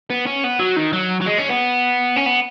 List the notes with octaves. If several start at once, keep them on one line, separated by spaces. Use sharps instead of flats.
B3
C#4
B3
F#3
D#3
F#3
F#3
G#3
C#4
B3
C#4
B3